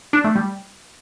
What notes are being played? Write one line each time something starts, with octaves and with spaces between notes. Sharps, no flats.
D4
A3
G3